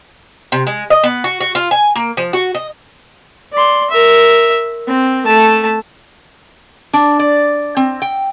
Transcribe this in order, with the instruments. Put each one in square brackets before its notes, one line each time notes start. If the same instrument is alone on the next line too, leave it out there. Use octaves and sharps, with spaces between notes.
[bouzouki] C3
G#3
D#5
B3
F#4
F#4
F4
G#5
A#3
F3
F#4
D#5
[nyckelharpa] D5 C6
A#4 E5
C4
A3 A5
[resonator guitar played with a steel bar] D4
D5
C4
G5